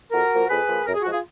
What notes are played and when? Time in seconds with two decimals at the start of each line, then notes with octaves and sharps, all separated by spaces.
0.11 F2 F#4 A#4
0.31 F3 A#3
0.49 F2 G#4 B4
0.68 F3 A#3
0.86 F#2 A#4
0.94 G#4
1.04 F3 G#3 F#4
1.12 F4 G#4